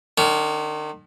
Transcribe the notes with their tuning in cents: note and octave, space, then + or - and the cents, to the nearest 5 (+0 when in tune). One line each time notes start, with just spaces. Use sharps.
D#3 -35 C#4 +35